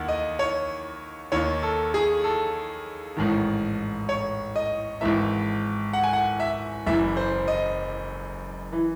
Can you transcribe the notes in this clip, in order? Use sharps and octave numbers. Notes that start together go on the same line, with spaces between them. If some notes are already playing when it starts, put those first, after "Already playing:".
Already playing: D#2 D#3 F#5
D#5
C#5
D#2 D#3 C#5
A4
G#4
A4
A1 G#2 D#3
C#5
D#5
G#1 G#2 E3 E5
F#5
G#5
F#5
E5
F#1 F#2 E3 E5
C5
D#5
E3